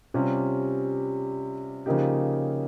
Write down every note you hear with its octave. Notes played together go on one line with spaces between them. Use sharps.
C3 G3 C#4 F4
C#3 F3 A#3 D#4 G4